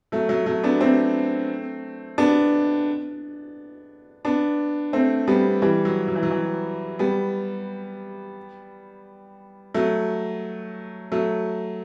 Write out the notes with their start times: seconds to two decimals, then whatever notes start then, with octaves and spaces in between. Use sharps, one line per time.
0.12 F#3 A3
0.29 F#3 A3
0.46 F#3 A3
0.64 B3 D4
0.80 A3 C4
2.18 B3 D4
4.25 B3 D4
4.93 A3 C4
5.28 G3 B3
5.62 E3 G3
5.85 F#3
6.08 F#3
6.15 E3
6.23 F#3
6.31 E3
6.99 G3 B3
9.74 F#3 A3
11.12 F#3 A3